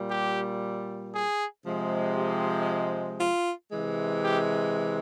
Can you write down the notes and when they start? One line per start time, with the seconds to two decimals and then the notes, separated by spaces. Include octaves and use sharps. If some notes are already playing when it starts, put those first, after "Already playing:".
Already playing: A#2 G3
0.10 G4
1.14 G#4
1.64 C3 F3 G#3
2.17 G4
3.20 F4
3.72 C3 E3 G#3
4.24 G4